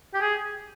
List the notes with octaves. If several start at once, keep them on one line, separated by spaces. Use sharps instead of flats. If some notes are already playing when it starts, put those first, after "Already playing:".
G4
G#4